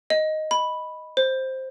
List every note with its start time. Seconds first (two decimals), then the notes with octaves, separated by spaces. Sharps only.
0.10 D#5
0.51 B5
1.17 C5